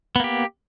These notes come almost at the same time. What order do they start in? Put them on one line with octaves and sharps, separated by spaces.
B3 A#3 G4